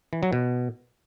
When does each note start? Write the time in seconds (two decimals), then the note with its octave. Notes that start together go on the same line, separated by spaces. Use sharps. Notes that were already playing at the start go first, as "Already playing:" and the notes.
0.13 E3
0.23 F#3
0.33 B2